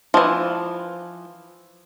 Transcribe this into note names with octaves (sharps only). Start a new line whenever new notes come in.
E3 F3